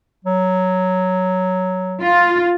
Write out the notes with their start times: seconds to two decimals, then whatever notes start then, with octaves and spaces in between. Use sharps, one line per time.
0.25 F#3
2.02 F4